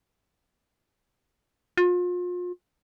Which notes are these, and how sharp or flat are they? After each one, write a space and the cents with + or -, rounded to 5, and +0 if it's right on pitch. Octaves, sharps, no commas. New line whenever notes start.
F4 +35